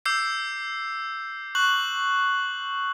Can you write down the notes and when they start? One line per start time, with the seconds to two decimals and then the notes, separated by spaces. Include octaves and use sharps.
0.06 D6 E6 G6 C7
1.55 C#6 F#6 F#7